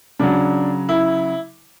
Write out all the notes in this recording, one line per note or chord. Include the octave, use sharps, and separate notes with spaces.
C#3 F#3 D4
E4